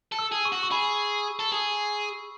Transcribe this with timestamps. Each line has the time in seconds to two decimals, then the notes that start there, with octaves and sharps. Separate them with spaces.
0.12 A4
0.19 E6
0.32 G#4
0.45 C#6
0.53 F#4
0.63 C#6
0.72 G#4 B5
1.39 A4
1.52 G#4